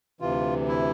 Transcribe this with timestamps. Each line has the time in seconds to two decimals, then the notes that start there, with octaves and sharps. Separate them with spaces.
0.20 D2 C3 E3 F4
0.68 E4